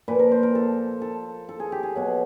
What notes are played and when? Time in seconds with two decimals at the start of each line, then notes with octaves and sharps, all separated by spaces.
0.08 A#2 F3 B4
0.19 A#4
0.32 C5
0.43 A#4
0.55 A4
1.02 A4
1.49 A4
1.60 G#4
1.72 G4
1.83 G#4
1.96 B2 F#3